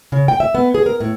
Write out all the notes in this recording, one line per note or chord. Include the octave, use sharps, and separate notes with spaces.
C#3
G5
E5
B3
G#4
A#4
A2